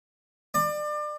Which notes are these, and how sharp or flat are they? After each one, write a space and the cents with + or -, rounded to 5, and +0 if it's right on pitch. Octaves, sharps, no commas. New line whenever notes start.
D5 +30